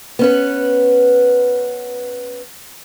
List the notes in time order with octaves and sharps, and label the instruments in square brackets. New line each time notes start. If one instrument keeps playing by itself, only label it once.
[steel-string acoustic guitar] B3 C#4 B4